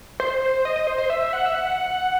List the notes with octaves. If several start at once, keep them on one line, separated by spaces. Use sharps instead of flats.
C5
D#5
D#5
C5
C5
E5
F#5
E5
F#5